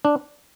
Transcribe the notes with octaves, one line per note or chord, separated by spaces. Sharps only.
D4